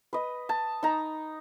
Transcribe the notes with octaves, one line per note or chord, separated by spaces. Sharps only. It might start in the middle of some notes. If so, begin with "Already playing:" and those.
B4 D#5
A5
D#4 A#5